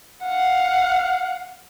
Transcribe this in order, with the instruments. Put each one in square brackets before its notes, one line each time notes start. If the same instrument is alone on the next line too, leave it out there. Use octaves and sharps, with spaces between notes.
[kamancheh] F5 F#5